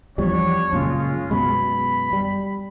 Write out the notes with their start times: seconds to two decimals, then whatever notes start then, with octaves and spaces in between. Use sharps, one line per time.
0.18 E2 F3 G3 D4 C#5
0.73 F#2 A#2 C#3 G#3 C#4 F4
1.31 F#2 B2 G#3 B5
2.13 G3